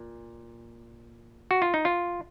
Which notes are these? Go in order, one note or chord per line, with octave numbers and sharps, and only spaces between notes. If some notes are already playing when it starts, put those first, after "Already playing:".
Already playing: A#2
F#4
F4
D#4
F4